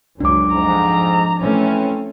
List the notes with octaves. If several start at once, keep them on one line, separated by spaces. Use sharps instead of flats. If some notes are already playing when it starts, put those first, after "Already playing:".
C#2 F#2 F#3 D4 D6
F2 G#2 F3 A#5
E3 A3 C4 C#4